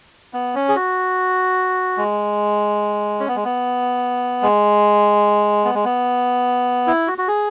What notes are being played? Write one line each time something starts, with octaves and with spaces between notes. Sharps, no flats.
B3
C#4
G#4
F#4
G#3
C#4
B3
G#3
B3
G#3
B3
G#3
B3
E4
F#4
F#4
G#4